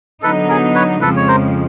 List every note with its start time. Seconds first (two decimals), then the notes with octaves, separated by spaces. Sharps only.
0.22 D3 F#3 B3 D#4 A4 B4
0.49 G#4 A#4
0.75 B4 C#5
1.01 F2 C#3 F3 G#3 A4 B4
1.17 C#5
1.28 A#4 C5